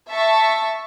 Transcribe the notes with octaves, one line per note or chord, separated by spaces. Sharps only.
E5 A5 C#6